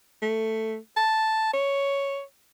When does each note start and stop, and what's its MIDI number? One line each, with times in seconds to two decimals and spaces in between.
0.22 0.77 57
0.97 1.52 81
1.53 2.22 73